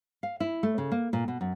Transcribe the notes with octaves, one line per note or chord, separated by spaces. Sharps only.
F5
E4
A3
C#3
A#3
A#2
B2
F#2